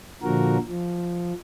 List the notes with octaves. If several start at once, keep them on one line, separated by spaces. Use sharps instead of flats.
A#2 D3 F3 F#4 A#4
F3